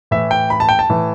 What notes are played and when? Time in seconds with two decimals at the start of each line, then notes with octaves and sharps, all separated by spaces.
0.11 A2 E3 E5
0.31 G5
0.50 B5
0.60 A5
0.69 G5
0.79 A5
0.89 A2 E3